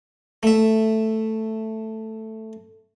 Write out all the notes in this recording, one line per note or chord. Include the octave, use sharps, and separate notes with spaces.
A3 E5